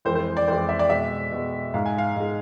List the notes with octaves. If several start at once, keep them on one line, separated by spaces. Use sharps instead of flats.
F2 E3 G#3 C5
C5
D5
F2 E3 G#3 C5
E5
D5
B2 G#3 E5
B2 G#3
G#2 G#3 F5
G#5
F5
G#2 G#3